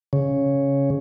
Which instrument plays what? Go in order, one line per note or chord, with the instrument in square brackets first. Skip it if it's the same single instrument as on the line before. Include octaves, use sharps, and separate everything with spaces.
[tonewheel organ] C#3